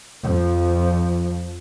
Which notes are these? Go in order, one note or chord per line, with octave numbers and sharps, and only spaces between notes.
F2 F3